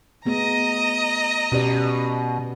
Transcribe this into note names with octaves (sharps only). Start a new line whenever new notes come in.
A3 B3 G#4 D#5 A#5
B2 C#4 G4 D5